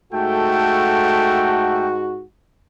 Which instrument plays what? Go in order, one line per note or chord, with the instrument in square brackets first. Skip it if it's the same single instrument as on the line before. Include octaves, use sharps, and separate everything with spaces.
[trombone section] G#2 F#4 [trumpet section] A3 A4 G5